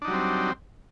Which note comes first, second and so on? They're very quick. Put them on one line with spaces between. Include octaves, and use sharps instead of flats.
D4 D#4 F#3 G3 C4